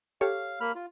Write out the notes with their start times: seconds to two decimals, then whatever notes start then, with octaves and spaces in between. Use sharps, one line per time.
0.21 G4 A4 C#5 F5
0.61 A#3 B5 F6
0.75 F4